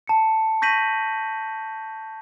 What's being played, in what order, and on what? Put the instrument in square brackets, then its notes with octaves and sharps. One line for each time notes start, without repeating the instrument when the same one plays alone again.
[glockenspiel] A5 C#7
C#6 G6 A#6 B6 D#7 F#7